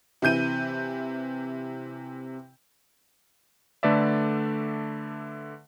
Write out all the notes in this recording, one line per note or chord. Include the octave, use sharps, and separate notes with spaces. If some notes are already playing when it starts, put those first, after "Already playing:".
C3 E3 G6 D#7
D3 A3 B4 D5 E5